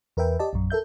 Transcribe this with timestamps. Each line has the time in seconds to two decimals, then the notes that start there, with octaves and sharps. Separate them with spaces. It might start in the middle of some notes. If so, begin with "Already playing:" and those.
0.17 E2 A#4 B4 E5 G5
0.39 G4 D5 D#5 A5
0.53 A#1 F#2
0.70 A4 A#4 E5 G6